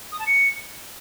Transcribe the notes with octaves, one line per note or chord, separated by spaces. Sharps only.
D#6
A5
C#7